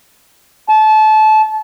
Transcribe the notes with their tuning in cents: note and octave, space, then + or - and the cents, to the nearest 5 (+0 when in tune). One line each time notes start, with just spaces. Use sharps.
A5 -25